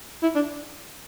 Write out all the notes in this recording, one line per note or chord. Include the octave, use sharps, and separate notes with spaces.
E4
D4